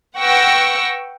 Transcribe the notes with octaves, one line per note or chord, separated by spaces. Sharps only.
B4 F#5 G5 C#6 E6 A#6